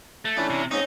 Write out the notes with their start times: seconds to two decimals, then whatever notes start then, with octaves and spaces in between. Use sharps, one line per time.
0.25 A3
0.37 E3 C#4 D4 E4
0.50 C3
0.71 G#2 C4 C#4 D#4 C#6 D#6